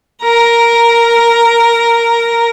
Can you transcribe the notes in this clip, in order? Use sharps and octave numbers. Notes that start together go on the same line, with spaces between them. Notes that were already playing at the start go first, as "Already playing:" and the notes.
A#4 A#5